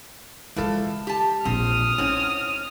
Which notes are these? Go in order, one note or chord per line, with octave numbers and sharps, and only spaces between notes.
C#3 E3 F3 G#3 A4
G4 A5
A#1 C4 F4 D#6 F6
G#2 C4 C#4 E4